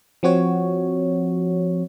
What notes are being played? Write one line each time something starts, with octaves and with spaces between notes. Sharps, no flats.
F3 C4 F#4 C#5